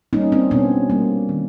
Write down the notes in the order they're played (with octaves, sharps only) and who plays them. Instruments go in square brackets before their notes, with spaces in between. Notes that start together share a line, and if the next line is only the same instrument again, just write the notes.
[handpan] G3 A#3 C#4 D#4
C4 D4
B2 B3 C#4
G3 A#3
D#3